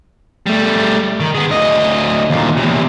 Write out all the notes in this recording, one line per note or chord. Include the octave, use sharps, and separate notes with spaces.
G3 A3
D#3
G#3 B3
D2 D#5
D#2 A#2
E2 C3